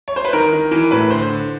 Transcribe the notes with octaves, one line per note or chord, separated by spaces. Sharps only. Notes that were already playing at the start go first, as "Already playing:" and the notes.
C#5
C5
B4
D#3 A#4
D#3
E3 A#4
A2 B4
D3 C5
D3